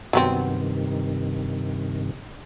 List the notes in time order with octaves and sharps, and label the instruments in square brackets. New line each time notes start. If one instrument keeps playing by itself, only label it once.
[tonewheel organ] G2 C3 D#3 [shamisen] F#3 B3 C4